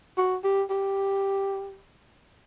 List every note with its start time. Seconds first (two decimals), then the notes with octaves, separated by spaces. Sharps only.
0.17 F#4
0.44 G4
0.70 G4